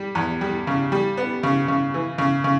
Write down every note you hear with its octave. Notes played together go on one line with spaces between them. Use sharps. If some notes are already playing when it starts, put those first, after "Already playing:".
Already playing: G3
E2
G3
C#3
G3
B3
C#3
C#3
E3
C#3
C#3